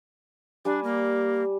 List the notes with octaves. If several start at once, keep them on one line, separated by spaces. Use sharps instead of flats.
G3 D4 G#5
A#3